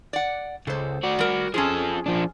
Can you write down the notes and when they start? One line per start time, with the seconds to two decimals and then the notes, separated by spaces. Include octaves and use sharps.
0.13 D5 F#5
0.67 C#2 A4 C5
1.04 F#4 D5
1.19 G3 A#4
1.54 F3 C#4 F4 G#4 A4
2.06 F3 D4